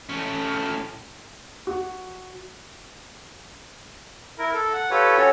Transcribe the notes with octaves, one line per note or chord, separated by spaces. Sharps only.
A2 C#4
F#4
E4 A#4
A4
F#5
F4 G4 A4 B4 C#5
C#4 F#4 A4 C#5